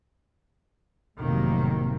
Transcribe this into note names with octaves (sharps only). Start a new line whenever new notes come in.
F1 A2 C3 D#3 F#3 A#3